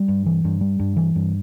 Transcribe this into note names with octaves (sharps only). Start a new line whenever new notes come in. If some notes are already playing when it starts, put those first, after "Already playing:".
Already playing: G3
G2
E3
G2
G3
G2
E3
G2